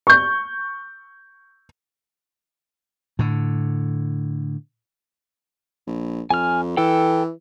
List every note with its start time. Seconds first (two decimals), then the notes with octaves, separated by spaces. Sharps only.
0.07 C#6 G6
3.19 A2 D3
5.87 A#1
6.30 F2 G#5 F6
6.77 E3 A4 G5